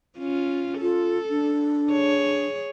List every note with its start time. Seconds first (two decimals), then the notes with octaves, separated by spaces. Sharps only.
0.18 C#4 F4
0.81 F4 A4
1.30 D4
1.91 G#4 C#5